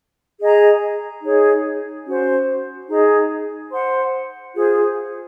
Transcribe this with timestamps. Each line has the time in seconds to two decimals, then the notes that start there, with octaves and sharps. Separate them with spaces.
0.40 G#4 D#5 A#5
1.23 D#4 G#4 C#5
2.06 C#4 F#4 C5
2.89 D#4 G#4 D#5 A#5
3.71 C5 F#5 C6
4.54 F4 G#4 C5